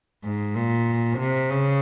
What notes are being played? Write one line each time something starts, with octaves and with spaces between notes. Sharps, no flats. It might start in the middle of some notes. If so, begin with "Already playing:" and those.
G#2
A#2
C3
C#3